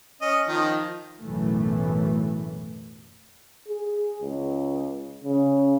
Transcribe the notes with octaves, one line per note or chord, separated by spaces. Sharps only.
C#4 D#5
D#3 F3
B1 F#2 A2 E3 A3
G#4
C#2
C#3